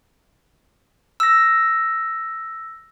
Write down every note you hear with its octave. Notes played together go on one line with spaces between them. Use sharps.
E6 A#6